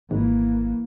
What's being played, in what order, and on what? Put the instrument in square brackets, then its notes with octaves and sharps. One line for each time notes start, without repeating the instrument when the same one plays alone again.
[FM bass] G#1 [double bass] E3 A#3